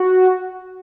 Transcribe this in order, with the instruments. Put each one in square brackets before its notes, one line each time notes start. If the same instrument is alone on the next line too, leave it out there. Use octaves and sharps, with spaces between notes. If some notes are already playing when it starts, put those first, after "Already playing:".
Already playing: [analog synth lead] F#4